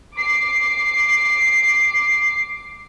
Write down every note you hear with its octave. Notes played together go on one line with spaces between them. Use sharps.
D6 C7